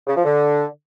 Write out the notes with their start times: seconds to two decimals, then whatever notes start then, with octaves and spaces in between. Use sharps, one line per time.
0.07 C#3
0.16 F3
0.25 D3